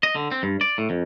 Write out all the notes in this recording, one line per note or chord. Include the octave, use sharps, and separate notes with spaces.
D#5
D3
C4
G2
D5
A2
F2